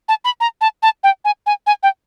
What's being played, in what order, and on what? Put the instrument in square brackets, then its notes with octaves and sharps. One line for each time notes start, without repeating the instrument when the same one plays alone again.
[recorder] A5
B5
A#5
A5
A5
G5
G#5
G#5
G#5
G5